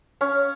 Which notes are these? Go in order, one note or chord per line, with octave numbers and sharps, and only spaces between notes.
C#4